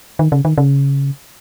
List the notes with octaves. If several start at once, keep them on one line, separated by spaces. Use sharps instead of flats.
D#3
C#3
D#3
C#3